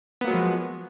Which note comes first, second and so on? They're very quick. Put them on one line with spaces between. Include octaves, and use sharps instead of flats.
B3 A#3 F#3 G#3 F3